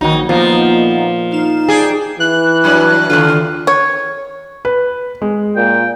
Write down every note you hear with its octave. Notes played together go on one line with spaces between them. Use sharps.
A#1 D#3 F#3 D#4
A#2 F3 A#3 B3 D#4
D#4 F5 E7
G#4 D5 G5 A5
E3 F#6
G2 F#3
D#2 D3 F4
C#5
B4
G#3
A#2 G5